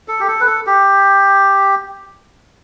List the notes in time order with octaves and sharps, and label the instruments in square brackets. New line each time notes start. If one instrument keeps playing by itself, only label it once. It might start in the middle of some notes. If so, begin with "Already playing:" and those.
[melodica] A4
G4
A4
B4
A4
G4